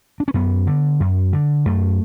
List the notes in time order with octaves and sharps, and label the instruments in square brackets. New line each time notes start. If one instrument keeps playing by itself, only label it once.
[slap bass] D4
C#4
F#2 B3
D3
F#2
D3
F#2 A3